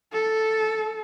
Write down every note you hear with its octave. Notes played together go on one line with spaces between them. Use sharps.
A4